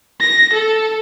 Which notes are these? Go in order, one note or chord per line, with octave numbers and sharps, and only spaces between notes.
A#6
A4